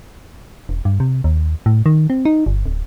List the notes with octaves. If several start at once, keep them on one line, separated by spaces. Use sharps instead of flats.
E1
G2
C3
D#2
A2
D#3
C4
D#4
G1
D1